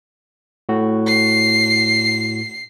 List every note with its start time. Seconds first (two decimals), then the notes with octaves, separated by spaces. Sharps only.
0.69 A2 F#4
1.08 C7